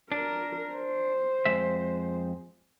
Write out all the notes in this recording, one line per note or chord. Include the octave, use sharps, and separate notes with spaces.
D4 A#4
C5
F2 G#3 E5